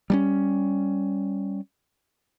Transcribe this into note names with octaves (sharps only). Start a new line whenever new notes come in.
G3 A3 C#4